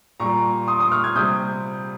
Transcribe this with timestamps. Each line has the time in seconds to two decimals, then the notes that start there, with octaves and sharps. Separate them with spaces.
0.20 A#2 G3 A#5 C#6
0.68 C6 D#6
0.80 C6 D#6
0.92 C#6 F6
1.04 F6 G#6
1.15 C3 G3 D#6 G6